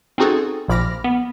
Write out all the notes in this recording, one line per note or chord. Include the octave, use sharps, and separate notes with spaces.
C4 C#4 D#4 F#4 G#4 A4
A#1 A#2 B5 D6 F6 A#6
B3